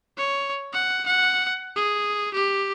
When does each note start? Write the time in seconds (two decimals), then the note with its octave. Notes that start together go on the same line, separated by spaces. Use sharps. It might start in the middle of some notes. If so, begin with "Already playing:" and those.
0.17 C#5
0.73 F#5
1.07 F#5
1.76 G#4
2.34 G4